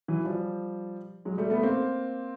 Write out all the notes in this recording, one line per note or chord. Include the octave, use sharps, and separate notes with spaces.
E3 F#3
F3 G3
F#3 G#3
G3 A3
A3 B3
A#3 C4